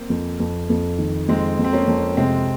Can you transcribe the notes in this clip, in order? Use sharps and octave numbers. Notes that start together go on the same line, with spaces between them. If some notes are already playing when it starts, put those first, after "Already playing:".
Already playing: A#3 C4
F2
F2
F2
D#3
F2 G#3 C4
F2
C4
A#3 C#4
F2
C3 G#3 C4